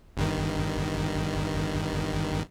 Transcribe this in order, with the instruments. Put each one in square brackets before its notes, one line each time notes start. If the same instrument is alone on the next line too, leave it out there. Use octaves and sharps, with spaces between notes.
[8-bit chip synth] G1 G2 D#3